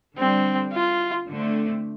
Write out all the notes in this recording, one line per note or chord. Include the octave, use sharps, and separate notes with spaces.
D3 G3 C4 D4
F4
D3 A3 C4